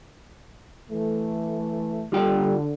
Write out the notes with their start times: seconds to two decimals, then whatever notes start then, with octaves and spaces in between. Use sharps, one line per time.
0.90 E3 A3
2.12 D3 G3 F4 G5